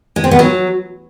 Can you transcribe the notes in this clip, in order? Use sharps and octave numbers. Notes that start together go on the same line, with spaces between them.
G#3
C4
B3
F#3